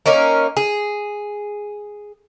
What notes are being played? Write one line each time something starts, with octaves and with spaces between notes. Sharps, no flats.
A#3 C#4 D#4 A#4
G#4